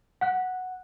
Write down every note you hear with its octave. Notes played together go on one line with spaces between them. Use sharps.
F#5 F#6